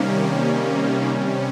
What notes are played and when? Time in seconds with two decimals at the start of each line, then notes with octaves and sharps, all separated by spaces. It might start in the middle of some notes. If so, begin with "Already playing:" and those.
Already playing: C3 D#3 G3 A#3 C#4
1.10 C3 G3 C#4